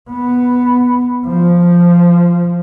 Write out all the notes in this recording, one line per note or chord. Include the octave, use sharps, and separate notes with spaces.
B3
F3